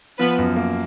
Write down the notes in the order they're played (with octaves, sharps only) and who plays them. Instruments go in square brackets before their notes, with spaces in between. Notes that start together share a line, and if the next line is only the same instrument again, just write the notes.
[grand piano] F3 [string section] B3 B4
[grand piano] F#2
A#3